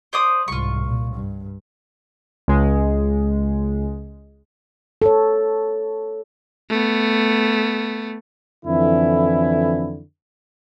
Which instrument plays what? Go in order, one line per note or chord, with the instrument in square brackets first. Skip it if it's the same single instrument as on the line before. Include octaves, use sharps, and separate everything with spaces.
[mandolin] C5 D5 D#6
[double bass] C2 G#2 [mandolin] F4 C#6
[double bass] A#2
G2
[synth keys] C#2 G#3
[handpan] A4 C#5
[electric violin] A3 B3
[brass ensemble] F2 D3 E3 E4